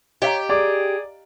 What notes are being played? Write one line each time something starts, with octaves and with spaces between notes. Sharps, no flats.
G4 C#5 D#5 F5 A#5
G#4 D5 D6